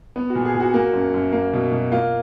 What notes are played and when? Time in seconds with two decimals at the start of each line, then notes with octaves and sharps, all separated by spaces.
0.16 B3
0.30 F#4
0.35 A#2
0.45 G#4
0.55 A#2
0.60 F#4
0.74 A#3
0.93 F#2
1.14 F#2
1.32 A#3
1.53 B2
1.72 B2
1.92 A#3 F4